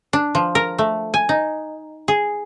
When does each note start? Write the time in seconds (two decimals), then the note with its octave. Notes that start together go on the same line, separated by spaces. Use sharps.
0.13 D4
0.35 F3
0.55 A#4
0.79 A3
1.14 G#5
1.29 D#4
2.08 G#4